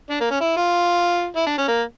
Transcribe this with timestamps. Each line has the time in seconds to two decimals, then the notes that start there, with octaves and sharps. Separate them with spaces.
0.10 D4
0.20 A#3
0.31 C#4
0.41 E4
0.57 F4
1.36 E4
1.47 D4
1.58 C#4
1.68 A#3